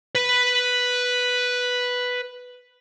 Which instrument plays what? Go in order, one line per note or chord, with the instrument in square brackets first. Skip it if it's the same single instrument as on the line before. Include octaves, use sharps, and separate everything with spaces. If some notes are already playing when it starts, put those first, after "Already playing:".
[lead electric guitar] B4 B5